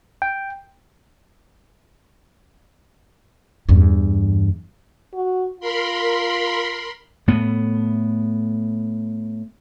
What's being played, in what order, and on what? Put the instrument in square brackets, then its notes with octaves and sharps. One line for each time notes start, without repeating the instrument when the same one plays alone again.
[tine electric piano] G5
[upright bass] E2 G2
[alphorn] F#4
[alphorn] F4 [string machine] A#4 B5 C6
[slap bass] A2 B3